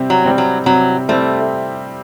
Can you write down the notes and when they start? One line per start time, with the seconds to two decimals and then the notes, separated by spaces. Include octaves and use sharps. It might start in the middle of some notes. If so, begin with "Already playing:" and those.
Already playing: C3 G3 C4
0.10 F#3
0.25 G3 C4
0.38 F#3
0.66 C3 F#3
1.09 G3 A3 C4